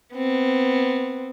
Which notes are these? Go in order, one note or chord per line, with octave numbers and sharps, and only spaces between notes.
B3 C4